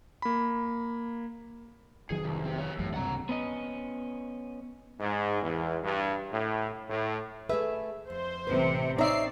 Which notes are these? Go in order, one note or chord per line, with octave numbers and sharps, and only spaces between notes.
A#3 B5
F1 D#3 F#3 G#4
C2
C4 G4
G4 C#5
G#1 F#2 A2 E3
C#2 G2 C3 F#5 A#5
B3 C#4 D#5
G#2
E2
G2
A2
A2
A3 G#4 B4 E5
F2 C5
A1 C3 B4
C4 D#4 C#5 D5 E5 C7